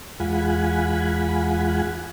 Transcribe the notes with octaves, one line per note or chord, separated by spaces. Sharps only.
E2 G#3 F4 F#5 G#5 B5